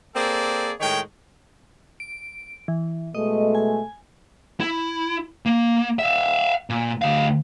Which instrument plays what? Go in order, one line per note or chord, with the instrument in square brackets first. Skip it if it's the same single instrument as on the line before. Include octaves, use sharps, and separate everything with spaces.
[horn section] A#3 C4 G#4 A4 D5
A2 D#3 G#3 C#5 G5
[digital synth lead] D7
E3
[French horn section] B2 G#3 A3 [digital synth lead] D#5
[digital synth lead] G#5
[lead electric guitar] E4
A#3
E5 F5
A#2
D2 F5